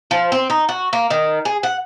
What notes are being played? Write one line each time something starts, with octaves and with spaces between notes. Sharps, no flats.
F3
C4
D#4
F#4
A#3
D#3
G#4
F#5